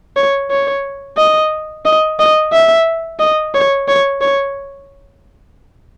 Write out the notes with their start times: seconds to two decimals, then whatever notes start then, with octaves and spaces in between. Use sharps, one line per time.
0.17 C#5
0.51 C#5
1.17 D#5
1.85 D#5
2.20 D#5
2.53 E5
3.20 D#5
3.54 C#5
3.88 C#5
4.21 C#5